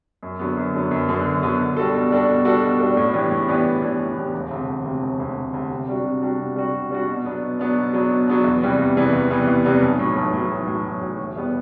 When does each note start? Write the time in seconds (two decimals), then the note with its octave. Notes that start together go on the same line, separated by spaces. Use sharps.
0.23 F#2
0.39 D3 F#3 B3
0.57 F#2
0.74 D3 F#3 B3
0.91 F#2
1.09 D3 F#3 B3
1.25 F#2
1.43 D3 F#3 B3
1.59 B2
1.77 G3 D4 F#4 A4
1.94 B2
2.11 G3 D4 F#4 A4
2.28 B2
2.45 G3 D4 F#4 A4
2.62 B2
2.80 G3 D4 F#4 A4
2.97 A2
3.14 E3 B3 D4 G4
3.31 A2
3.48 E3 B3 D4 G4
3.65 A2
3.82 E3 B3 D4 G4
3.99 A2
4.16 E3 B3 D4 G4
4.34 E1
4.51 D2 C3
4.68 E1
4.85 D2 C3
5.02 E1
5.20 D2 C3
5.36 E1
5.54 D2 C3
5.71 C3
5.88 G3 D4 F#4
6.05 C3
6.22 G3 D4 F#4
6.39 C3
6.56 G3 D4 F#4
6.74 C3
6.91 G3 D4 F#4
7.08 B2
7.25 F#3 B3 D4
7.42 B2
7.59 F#3 B3 D4
7.76 B2
7.93 F#3 B3 D4
8.10 B2
8.28 F#3 B3 D4
8.44 E2
8.62 C3 E3 G3 B3
8.79 E2
8.96 C3 E3 G3 B3
9.13 E2
9.30 C3 E3 G3 B3
9.47 E2
9.65 C3 E3 G3 B3
9.81 B1
9.99 A2 F#3
10.16 B1
10.33 A2 F#3
10.50 B1
10.67 A2 F#3
10.85 B1
11.02 A2 F#3
11.18 E1
11.36 E2 B2 G3 B3